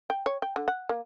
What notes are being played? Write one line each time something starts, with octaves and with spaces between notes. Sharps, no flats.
G5
C#5
G5
D3
F#5
A#3